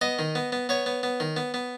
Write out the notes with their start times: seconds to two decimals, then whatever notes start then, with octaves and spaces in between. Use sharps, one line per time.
0.01 B3 D#5
0.19 D#3
0.35 B3
0.52 B3
0.69 B3 C#5
0.86 B3
1.03 B3
1.20 D#3
1.37 B3
1.54 B3